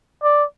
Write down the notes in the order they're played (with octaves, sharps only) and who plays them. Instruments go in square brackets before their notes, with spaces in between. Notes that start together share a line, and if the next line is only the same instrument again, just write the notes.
[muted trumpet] D5